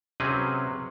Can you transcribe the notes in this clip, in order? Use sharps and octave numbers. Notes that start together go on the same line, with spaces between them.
C3 F#3 C4 C#4 G#4 B4